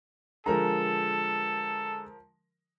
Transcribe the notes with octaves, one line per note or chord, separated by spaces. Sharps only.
D3 F3 G#3 A4 A#4 A#5